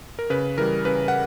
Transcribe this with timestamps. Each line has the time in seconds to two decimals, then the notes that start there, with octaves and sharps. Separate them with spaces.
0.19 A#4
0.30 C#3 B4
0.58 E3 A#4
0.61 G3
0.85 C#3 B4
1.08 F#5